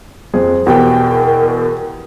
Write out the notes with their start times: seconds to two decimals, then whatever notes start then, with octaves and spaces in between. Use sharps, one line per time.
0.34 F2 G#4
0.66 E2 B2 G4 A#4 G5